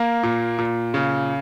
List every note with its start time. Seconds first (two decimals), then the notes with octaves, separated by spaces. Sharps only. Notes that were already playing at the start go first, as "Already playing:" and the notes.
Already playing: A#3
0.23 A#2
0.58 A#2
0.94 C#3